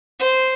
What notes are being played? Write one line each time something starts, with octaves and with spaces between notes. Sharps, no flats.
C5